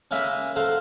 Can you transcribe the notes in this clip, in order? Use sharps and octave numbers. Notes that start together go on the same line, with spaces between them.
C#3 G#3 A#3 A#4 E5 B5
A4 A#4 C5 F5 F#5